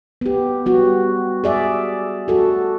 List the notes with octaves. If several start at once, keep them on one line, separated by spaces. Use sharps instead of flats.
B3 G4
G3 B3 F#4
G#4 D5 E5
F#4 A4